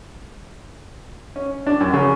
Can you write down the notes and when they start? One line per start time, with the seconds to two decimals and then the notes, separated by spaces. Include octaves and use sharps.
1.36 C#4
1.67 D4
1.80 F#2
1.93 C#3